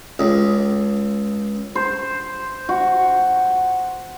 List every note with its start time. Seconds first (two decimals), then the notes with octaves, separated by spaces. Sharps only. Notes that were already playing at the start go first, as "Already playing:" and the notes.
0.19 C#2
1.75 C5
2.69 F#4